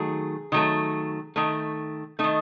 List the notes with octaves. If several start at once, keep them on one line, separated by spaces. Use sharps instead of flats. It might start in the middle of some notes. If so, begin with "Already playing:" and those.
Already playing: D#3 F#3 A3 G#4
D#3 F#3 A3
D#3 A3
D#3 A3 D#4